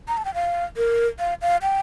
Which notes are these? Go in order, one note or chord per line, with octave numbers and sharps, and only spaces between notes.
A#5
A5
G5
F5
A#4
F5
F5
G5